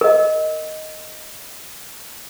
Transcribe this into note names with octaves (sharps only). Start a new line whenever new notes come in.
A#4 D#5